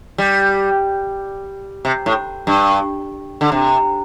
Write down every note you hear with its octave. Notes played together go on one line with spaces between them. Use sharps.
G3
C3
A2
G2
D3
C3